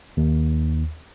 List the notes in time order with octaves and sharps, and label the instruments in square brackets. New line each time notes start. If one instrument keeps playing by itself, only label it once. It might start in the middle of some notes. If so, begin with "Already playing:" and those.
[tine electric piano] D#2